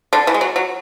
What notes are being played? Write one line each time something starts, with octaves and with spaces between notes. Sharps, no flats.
D3
E3
G#3
F#3
F#3